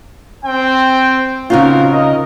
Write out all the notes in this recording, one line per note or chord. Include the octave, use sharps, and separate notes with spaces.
C4 G5
C#3 C4 D#4 F4 F#4 A#4
A#4 D#5